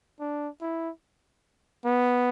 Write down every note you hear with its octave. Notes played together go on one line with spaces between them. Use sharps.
D4
E4
B3